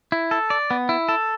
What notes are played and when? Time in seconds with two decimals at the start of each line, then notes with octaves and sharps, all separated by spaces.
0.12 E4
0.31 A4
0.50 D5
0.71 B3
0.89 E4
1.09 A4